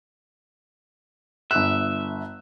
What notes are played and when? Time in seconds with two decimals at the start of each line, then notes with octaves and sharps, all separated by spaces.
1.51 G1 E5 F#6